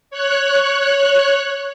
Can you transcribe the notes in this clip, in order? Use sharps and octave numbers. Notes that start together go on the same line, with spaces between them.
C#5 F#6